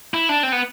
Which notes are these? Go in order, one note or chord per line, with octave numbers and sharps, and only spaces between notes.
E4
D4
C4
B3